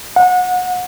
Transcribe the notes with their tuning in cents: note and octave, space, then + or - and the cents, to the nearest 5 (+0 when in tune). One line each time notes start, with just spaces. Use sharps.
F#5 -25